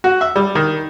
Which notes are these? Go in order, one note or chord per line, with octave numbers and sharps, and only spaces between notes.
F#4
E5
G3
D#3